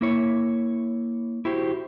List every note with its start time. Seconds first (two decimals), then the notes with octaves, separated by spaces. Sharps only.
0.01 A#3 E4 C#5
1.45 E4 F#4 G4 C5